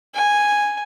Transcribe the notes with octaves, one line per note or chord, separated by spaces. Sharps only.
G#5